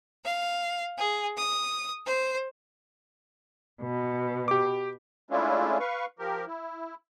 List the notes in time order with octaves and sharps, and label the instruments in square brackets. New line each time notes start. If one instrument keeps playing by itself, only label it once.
[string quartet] F5
G#4
D#6
C5
[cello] B2
[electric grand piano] G4 D6
[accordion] G#3 A3 C#4 D4 E4 F4
B4 F5 C#6
F3 G4 A#4
E4